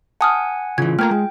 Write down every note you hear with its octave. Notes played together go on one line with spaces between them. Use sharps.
F#5 G#5 A5 D#6 F6
C#3 E3 F4 G#6
A3 A#3 G5 A#5 F6 G#6
G#3